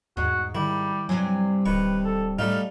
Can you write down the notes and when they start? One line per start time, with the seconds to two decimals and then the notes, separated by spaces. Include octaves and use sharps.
0.17 E2 G#2 F#4
0.55 D#3 G3 E4
1.09 G2 C3 F#3 G#5
1.66 D1 D#3 B4 C#6
2.04 A4
2.39 A2 G3 A3 D#4 F5